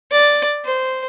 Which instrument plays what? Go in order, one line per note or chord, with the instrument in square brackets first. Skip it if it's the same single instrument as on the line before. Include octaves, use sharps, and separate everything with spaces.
[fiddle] D5
C5